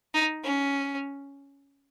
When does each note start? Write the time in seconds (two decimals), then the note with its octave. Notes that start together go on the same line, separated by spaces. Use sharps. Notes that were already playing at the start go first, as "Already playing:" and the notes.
0.14 D#4
0.43 C#4